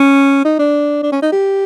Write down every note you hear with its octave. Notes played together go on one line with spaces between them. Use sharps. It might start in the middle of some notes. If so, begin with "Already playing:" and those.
Already playing: C#4
D#4
D4
D4
C#4
D#4
G4